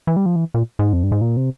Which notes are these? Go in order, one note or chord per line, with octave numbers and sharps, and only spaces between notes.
E3
G3
F3
E3
A#2
G#2
F2
G2
G#2
A#2
C3